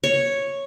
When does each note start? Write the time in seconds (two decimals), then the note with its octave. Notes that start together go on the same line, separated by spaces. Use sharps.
0.04 C#5